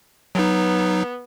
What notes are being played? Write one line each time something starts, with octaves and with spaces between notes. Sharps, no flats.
F#3 B3 D#4